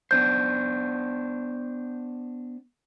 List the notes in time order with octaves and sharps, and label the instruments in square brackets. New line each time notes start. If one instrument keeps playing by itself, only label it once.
[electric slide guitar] B3 D4 C5 [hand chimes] G6